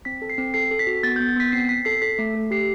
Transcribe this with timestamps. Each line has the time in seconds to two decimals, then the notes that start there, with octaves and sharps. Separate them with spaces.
0.05 C4 B6
0.22 A4
0.29 C7
0.38 C4
0.54 A4 C7
0.71 A4
0.79 B6
0.87 F#4
1.03 B3 A6
1.16 G6
1.20 B3
1.29 A6
1.36 B3 B6
1.52 C4 C7
1.69 C4 B6
1.85 A4 C7
2.02 A4 B6
2.19 A3
2.35 A4
2.51 G4 C7